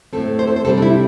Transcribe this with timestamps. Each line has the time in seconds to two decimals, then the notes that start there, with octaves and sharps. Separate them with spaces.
0.13 A2 A3 C4 A4
0.39 C5
0.47 A4
0.56 C5
0.65 C3 G3 C4 A4
0.78 D4
0.82 E4